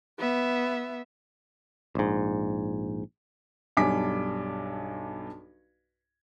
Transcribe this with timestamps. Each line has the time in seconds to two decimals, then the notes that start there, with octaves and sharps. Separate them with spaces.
0.19 B3 E5
1.95 A#1 G#2
3.77 B1 G2 G#5 D6 B6